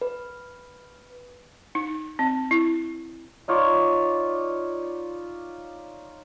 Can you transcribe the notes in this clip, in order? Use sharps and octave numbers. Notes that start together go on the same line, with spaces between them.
B4
D#4
C4
E4
D#4 F4 C#5 D5